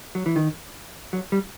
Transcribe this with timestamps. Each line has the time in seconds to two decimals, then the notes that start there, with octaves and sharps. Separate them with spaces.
0.15 F#3
0.26 E3
0.36 D#3
1.13 F#3
1.32 G3